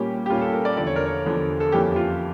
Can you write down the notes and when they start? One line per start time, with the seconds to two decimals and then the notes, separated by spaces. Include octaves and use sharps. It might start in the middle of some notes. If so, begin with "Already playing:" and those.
Already playing: A#2 G3 A#3 C#4 G4
0.26 G4
0.30 A#2 G3 A#3 C#4 F4
0.41 A4
0.53 A#4
0.65 D5
0.77 E2 D3 F3 D5
0.87 C#5
0.96 A#4
1.06 C#5
1.25 E2 D3 F3
1.60 A4
1.72 F2 E3 A#3 C#4 G4
1.91 G4
1.96 F4